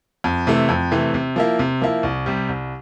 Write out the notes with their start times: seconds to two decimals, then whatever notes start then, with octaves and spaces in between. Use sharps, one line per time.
0.24 F2
0.47 C3 E3 A3
0.69 F2
0.91 C3 E3 A3
1.14 C3
1.36 F3 A#3 E4
1.59 C3
1.81 F3 A#3 E4
2.03 C2
2.26 C3 G3
2.49 C2